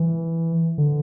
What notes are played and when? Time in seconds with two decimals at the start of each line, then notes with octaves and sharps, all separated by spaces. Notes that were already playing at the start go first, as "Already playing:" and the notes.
Already playing: E3
0.78 D3